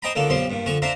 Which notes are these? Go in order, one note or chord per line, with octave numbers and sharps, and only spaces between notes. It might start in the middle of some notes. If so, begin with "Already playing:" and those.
C5 D#5 G5 G#5 A#5 B5
C#2 D3 D#3 A#3 A4
B1 F3 G3 C4 C6
G2 A#2
D3 F3 G#5 C#6
D4 C5 E5 F5 A#5